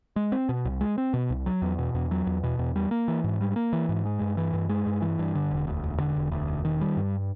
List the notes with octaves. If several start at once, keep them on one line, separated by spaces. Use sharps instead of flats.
G#3
C4
B2
C2
G#3
C4
B2
C2
F#3
E2
B2
E2
F#3
E2
B2
E2
G3
A#3
E3
G#2
G3
A#3
E3
G#2
G#3
G2
E3
G2
G#3
G2
E3
G2
D3
E1
D2
E1
D3
E1
D2
E1
D#3
G3
G2